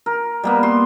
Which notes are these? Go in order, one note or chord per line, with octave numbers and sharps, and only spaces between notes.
A#4
G3 A#3 B3
C6